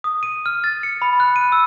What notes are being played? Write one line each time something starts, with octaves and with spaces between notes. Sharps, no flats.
D#6
D#7
F6
A6
C#7
B5
F#6
D#7
E6